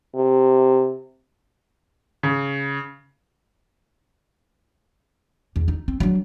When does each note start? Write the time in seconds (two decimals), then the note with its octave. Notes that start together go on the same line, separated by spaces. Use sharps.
0.15 C3
2.23 C#3
5.56 E2
5.68 D#4
5.88 C4
6.00 F#3 D4